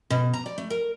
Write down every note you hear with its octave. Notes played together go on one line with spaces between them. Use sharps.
B2
A#5
D5
A3
A#4